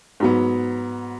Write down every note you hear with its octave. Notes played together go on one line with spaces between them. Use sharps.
G#2 F#3 B3